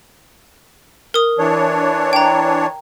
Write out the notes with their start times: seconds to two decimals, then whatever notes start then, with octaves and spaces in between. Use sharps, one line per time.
1.14 A#4 D#6
1.39 E3 D4 C#5
2.13 G5 A#5